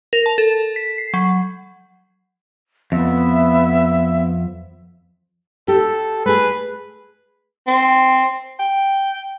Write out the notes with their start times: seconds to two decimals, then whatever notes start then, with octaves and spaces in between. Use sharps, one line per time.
0.13 A#4
0.26 A5
0.38 A4
0.76 B6
0.98 C7
1.14 F#3
2.92 F2 B3 E5
5.68 G4 A4
6.26 A3 G#4 B4
7.67 C4
8.59 G5